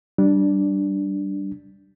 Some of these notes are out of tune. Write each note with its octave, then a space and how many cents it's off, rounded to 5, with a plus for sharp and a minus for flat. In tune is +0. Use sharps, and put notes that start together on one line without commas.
G3 -15 D4 +0